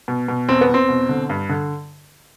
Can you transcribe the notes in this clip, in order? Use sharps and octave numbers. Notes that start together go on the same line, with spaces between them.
B2
B2
E2 C4
B3
E2
C4
B2
D3
G2
D3